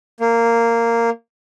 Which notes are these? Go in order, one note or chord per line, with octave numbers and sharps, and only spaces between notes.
A#3